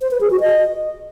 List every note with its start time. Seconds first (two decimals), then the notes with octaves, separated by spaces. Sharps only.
0.01 C5
0.11 B4
0.21 G#4
0.30 F#4
0.40 D#5